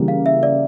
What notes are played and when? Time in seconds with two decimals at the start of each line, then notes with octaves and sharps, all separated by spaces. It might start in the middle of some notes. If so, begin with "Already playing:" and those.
Already playing: C#3 E3 G3 A#3
0.08 F5
0.26 E5
0.43 D5